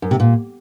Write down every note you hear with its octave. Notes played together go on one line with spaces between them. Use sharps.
F#2
C3
A#2